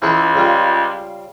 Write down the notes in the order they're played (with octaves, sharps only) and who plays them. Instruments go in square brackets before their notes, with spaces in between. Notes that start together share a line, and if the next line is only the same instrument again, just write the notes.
[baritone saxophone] C#2 [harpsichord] E3 G#4 B4
[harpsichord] C#3 G3 F4